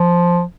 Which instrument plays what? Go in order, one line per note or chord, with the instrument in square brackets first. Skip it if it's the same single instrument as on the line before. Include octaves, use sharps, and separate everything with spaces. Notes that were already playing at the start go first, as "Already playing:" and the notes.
Already playing: [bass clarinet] F3